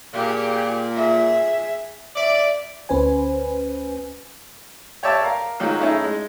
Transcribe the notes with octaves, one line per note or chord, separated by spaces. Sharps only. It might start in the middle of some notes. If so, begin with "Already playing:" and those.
A#2 G4 G#4
G#4 E5
D5 E5
D2 C#4 B4 C5 G#5
G4 C#5 D5 E5 A5 D6
A#4 F5
G#2 D#3 F#3 F4
A3 C#4 D#4 E4 G#4
G#3